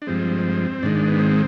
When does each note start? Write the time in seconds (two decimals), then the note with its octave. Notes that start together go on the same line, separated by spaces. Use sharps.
0.02 D4
0.07 G2 F3 G#3 C4
0.83 G#2 D#3 G#3 D4
0.95 D4
1.08 B3
1.14 D4
1.19 C4